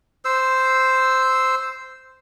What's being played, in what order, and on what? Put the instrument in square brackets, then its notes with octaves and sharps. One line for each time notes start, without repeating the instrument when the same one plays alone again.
[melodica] C5 E6